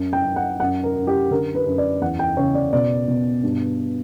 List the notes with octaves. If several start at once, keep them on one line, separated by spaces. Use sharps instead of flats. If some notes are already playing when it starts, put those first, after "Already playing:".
Already playing: F#2
G5
F#2
F#5
F#2 F#5
A#4
F#2
G4
D3 A#4
B4
F#2
D5
E2 F#5
G5
C#3 C#5
D5
B2 D5
B2
G2